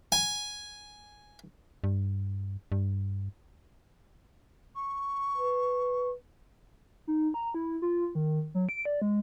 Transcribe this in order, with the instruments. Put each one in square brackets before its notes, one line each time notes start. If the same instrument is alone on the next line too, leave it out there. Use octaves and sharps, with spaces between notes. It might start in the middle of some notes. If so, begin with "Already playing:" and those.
[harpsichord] G#5
[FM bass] G2
G2
[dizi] C#6
[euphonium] B4
[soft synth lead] D#4
A#5
E4
F4
D#3
F#3
D7
D5
G#3